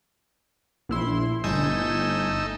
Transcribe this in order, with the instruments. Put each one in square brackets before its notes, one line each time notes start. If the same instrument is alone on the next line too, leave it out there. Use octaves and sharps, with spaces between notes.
[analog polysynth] A#1 E4 C6
[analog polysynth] G1 G#5 G6 [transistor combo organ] A3 D#4 E6